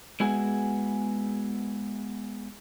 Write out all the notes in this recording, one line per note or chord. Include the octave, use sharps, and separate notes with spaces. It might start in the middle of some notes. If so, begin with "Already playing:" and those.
G#3 B3 E4 F#4 G#4